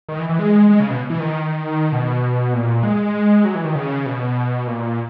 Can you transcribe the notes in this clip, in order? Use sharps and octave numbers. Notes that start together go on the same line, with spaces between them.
D#3
E3
E3
G#3
G#3
C#3
B2
E3
D#3
B2
A#2
G#3
F#3
E3
D#3
C#3
B2
A#2